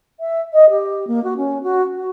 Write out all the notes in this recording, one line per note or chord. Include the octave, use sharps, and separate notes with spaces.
E5
D#5
G4
A#3
F#4
C#4
F#4
F#4